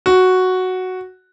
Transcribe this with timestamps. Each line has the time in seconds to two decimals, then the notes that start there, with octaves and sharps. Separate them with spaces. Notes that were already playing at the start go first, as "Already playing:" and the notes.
0.06 F#4